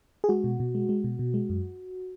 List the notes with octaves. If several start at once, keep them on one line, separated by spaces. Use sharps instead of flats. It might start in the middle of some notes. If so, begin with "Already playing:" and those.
G#4
G#3 F#4
B2
B2
G#3
G#3
B2
B2
G#3
F#2